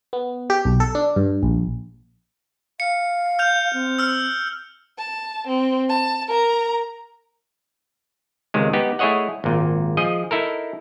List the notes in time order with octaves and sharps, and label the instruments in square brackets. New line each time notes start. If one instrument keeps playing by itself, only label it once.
[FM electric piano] B3
G4
B1
A4
D4
G2
A#1
[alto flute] F5 [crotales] C#7
[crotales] F6 G6 F7
[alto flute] C4
[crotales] E6 F6
[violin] A5
C4
A5
A#4 A#5
[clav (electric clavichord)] C#2 C3 D#3 G#3
B3 D#4 G4
A3 E4 G#4 C#5 D#5 F#5
G#1 A#2
F3 G#4 D#5
D#4 E4 A4 A#4